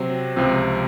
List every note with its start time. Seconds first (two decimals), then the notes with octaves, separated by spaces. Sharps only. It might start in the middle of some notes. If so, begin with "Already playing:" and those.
Already playing: C3 F#3 C4
0.36 C#2 C3 F3 C4